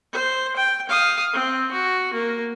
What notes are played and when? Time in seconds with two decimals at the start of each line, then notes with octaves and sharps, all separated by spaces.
0.12 C5
0.56 G5
0.89 F5 D#6
1.33 C4
1.72 F#4
2.14 A#3